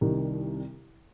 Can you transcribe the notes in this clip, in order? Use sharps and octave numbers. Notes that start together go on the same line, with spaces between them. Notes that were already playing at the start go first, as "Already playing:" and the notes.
C2 C3 D#3 G3 D4